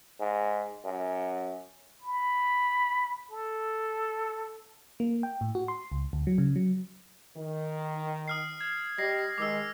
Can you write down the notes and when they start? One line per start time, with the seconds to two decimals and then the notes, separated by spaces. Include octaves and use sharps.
0.20 G#2
0.85 F#2
2.02 B5
3.31 A4
5.00 A#3
5.23 G5
5.41 A2
5.55 F#4
5.68 C6
5.92 C#2
6.13 D2
6.27 F#3
6.38 C#3
6.56 F#3
7.37 D#3
8.28 D#6 F6 C7
8.61 G#6
8.98 G3 D#5 A#6 C7
9.38 D#3 G#3 D6 E6